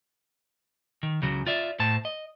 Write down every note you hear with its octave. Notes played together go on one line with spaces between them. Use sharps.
D#3
C#2 C#3 F#3
F4 D5 E5
A2 C5 A5
D#5